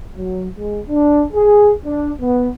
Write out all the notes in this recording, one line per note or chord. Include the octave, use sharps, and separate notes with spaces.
F#3
G#3
D4
G#4
D4
B3